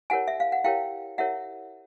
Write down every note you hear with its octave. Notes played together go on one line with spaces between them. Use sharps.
E4 G4 A#4 C#5 F#5 G#5
E5
F5
F#5
E4 G4 A#4 C#5 F5 G5
E4 G4 A#4 C#5 E5 F#5